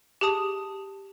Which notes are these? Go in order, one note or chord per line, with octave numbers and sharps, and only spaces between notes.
G4 G#4 A5 D#6